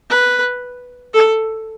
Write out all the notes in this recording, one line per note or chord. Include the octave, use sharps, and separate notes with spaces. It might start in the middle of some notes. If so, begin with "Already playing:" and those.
B4
A4